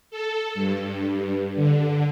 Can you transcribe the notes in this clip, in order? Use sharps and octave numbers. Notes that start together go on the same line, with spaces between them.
A4
G2
D3